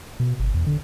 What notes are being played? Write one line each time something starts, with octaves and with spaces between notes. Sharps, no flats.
B2
G1
E2
D3